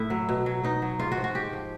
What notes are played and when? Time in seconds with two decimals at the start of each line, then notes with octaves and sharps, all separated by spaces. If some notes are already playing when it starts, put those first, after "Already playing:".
Already playing: A2 E4
0.10 F#3
0.29 B2
0.46 F#3
0.63 B2 D#4
0.82 F#3
0.99 G#2 F4
1.12 F#4
1.17 F3
1.24 F#4
1.35 G#2 G4
1.53 F3